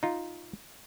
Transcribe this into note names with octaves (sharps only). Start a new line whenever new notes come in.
D#4 F4